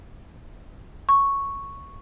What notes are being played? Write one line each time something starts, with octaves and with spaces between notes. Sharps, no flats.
C#6